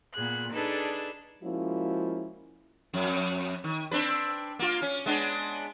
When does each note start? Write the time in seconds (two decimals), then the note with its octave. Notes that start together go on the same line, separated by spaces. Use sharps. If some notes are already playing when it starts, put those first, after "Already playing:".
0.14 A#2 B3 G#4 F#6
0.53 D4 D#4 G#4 A4 B4
1.43 F3 G#3 A#3 C#4 E4 F#4
2.94 F2
3.64 D#3
3.91 C4 D4 B4
4.59 A#3 F4
4.82 C#4
5.06 G#3 B3 D4